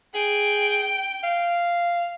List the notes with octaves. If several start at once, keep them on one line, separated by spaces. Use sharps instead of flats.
G#4 G5
F5